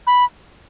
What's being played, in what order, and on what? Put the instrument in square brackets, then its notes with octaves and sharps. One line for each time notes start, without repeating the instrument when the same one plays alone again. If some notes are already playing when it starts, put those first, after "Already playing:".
[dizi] B5